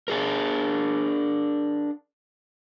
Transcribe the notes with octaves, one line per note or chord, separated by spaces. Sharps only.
D4 G#4 A#4